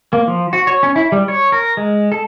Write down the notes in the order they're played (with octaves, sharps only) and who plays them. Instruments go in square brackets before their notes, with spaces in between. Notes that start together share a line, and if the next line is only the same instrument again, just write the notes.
[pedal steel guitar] A#3
F3
F#4
C#5
C#4
E4
G3
C#5
A#4
G#3
A4